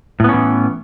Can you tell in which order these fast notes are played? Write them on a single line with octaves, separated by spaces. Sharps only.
A2 B3 C#4 E3